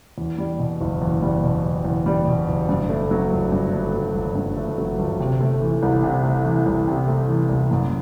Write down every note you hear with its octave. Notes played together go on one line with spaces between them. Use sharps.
E2
G3
B2
F#1
E2
G3
B2
F#1
E2
G3
B2
F#1
G2
A3
F#3
G1
G2
A3
F#3
G1
G2
A3
F#3
G1
C3
A3
E3
C2
C3
A3
E3
C2
C3
A3
E3
C2
F#2